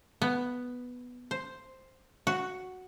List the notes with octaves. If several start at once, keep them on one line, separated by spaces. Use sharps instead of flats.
B3
C5
F#4